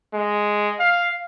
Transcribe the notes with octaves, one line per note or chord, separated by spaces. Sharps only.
G#3
F5